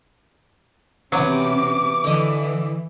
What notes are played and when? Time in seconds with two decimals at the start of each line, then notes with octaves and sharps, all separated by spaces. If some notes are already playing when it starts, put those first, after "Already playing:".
1.12 E2 C3 F#3 B3 C#4 D6
2.04 D3 E3 D#5